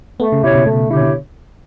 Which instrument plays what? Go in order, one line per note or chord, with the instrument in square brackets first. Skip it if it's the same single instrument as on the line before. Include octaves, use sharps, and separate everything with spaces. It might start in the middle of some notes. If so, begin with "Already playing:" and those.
[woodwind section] A3 [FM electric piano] B3
[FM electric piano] C#3
[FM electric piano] B2 [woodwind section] E4 G4 C#5
[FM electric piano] B2
[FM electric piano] B2 [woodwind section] A3
[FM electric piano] D3 [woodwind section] E4 G4 C#5
[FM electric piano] B2